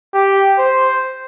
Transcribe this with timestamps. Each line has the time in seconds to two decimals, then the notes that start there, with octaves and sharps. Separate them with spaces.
0.13 G4
0.58 C5